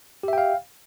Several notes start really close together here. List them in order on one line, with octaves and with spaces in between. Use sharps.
G4 E5 G5 F5